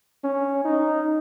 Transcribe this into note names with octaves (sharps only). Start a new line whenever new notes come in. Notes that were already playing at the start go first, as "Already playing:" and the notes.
C#4
D#4